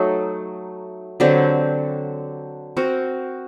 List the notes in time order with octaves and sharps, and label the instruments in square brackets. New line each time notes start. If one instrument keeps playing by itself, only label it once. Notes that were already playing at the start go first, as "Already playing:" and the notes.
Already playing: [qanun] F#3 A3 D#4 A4
D3 F#3 C4 G4
C4 F#4 A#4